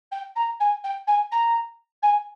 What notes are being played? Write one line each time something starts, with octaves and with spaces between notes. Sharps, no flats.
G5
A#5
G#5
G5
G#5
A#5
G#5